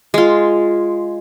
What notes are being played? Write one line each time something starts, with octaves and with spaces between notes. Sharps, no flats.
G#3 F4